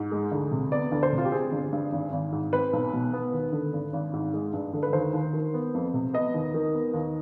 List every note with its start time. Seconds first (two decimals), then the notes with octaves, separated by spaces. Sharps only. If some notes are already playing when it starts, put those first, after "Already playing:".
Already playing: G#2
0.11 G#3
0.32 D2
0.51 C3
0.72 B3 D5
0.92 D2
1.03 C5
1.12 C3
1.18 F4
1.25 G4
1.32 C4 G#4
1.52 G1
1.73 G2
1.93 G#1
2.12 G#1
2.32 G#2
2.53 C4 B4
2.73 B1
2.93 B2
3.13 B3
3.33 D#2
3.52 D3
3.73 G#1
3.93 G#1
4.14 G#2
4.34 G#3
4.53 G2
4.73 D3
4.83 B4
4.93 D#2 C5
5.13 D#2
5.34 D#3
5.54 B3
5.74 F2
5.94 C3
6.13 B3 D#5
6.34 D#2
6.54 D#3
6.74 B3
6.94 D#2